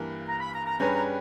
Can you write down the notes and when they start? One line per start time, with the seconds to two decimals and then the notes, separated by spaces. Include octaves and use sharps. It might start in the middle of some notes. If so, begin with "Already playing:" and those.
Already playing: G2 E3 A#3
0.27 A#5
0.40 B5
0.54 A#5
0.66 A#5
0.80 G2 G3 C#4 G#4 B4 A#5
0.94 A#5